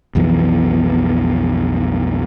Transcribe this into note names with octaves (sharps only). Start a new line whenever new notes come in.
B1 F2 E3 B3